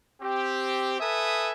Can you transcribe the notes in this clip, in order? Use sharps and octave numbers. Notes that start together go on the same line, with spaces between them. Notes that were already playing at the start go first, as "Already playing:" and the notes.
C4 G4
A4 B4 E5 G#5 D#6